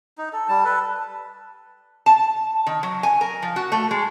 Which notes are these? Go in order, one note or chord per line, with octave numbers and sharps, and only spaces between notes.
D#4
A4
G3 A5
A4 B4
A5
D#3
F#3
G#5
A#4
F3
F#4
A3
G#3